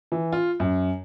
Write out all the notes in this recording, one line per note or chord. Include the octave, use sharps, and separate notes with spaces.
E3
F4
F#2